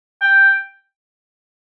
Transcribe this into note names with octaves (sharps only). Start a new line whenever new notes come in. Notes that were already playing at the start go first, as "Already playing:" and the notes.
G5